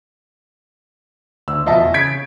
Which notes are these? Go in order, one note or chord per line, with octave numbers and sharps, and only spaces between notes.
D2 E6
B2 F3 D#5 E5 A5
E2
C#3 G#6 B6 D7